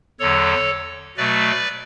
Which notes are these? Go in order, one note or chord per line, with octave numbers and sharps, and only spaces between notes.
E2 D3 F#3 A4 C#5
B2 F#3 A3 B4 D5